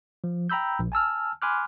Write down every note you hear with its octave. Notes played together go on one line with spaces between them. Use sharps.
F3
G5 A#5 B5 E6 G6
A#1
G#5 A5 E6 F6
G#5 B5 C6 D6 F6 F#6